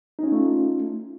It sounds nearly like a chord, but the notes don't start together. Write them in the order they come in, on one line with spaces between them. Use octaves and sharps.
D#4 C#4 F4 A3